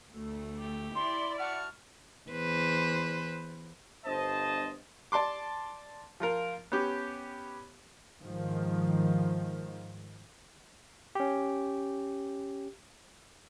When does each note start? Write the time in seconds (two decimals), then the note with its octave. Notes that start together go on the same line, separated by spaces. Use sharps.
0.13 D2 A3
0.57 G4
0.95 E4 D5 C6
1.39 F#4 F#5 A5 F6
2.30 E2 B4 C5
4.04 G1 C5 D#5 A5
5.12 D5 A5 C6 D6
6.20 F3 F4 A#4
6.72 B3 C#4 G4
8.21 G#2 D#3 F3
11.15 C#4 G4